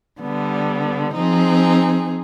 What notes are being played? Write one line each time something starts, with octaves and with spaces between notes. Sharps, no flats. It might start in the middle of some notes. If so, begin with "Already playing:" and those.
D3 G3 B3
F3 C4 D#4 G#4